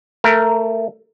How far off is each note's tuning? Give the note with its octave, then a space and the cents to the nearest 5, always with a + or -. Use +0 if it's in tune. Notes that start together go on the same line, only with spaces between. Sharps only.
A3 +20 A#4 +0